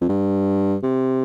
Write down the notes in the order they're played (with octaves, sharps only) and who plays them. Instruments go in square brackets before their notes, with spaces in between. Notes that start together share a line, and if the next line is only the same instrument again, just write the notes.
[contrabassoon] F2
G2
C3